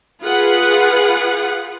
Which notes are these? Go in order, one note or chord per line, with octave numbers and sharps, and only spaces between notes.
F4 G#4 B4 F#5